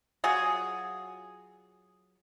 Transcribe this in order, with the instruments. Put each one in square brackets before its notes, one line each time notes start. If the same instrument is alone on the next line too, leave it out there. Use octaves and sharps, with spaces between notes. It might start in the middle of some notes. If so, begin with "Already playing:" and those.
[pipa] F#3 F4 F#4 G#4